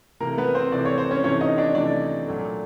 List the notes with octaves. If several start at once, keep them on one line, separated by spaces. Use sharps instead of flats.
C3 E3 A3 A#3 A#4
B3 B4
C4 C5
C3 E3 A3 D5
C#5
C5
C#4 C#5
C3 E3 A3 C#4 C#5
D#4 D#5
D4 D5
C3 E3 A3 D4 D5
A#2 F#3 A3